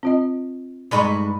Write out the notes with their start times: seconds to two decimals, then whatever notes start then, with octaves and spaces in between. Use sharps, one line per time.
0.03 C4 F4 D#5
0.91 G2 G#3 D#4 B4 B5 C#6